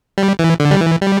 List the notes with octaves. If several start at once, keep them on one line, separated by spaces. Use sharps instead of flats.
G3
E3
D3
G3
E3
G3